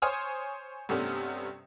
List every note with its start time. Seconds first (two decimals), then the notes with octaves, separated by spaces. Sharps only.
0.02 C5 C#5 G#5 D#6 F6
0.89 G2 C3 A3 B3 C#4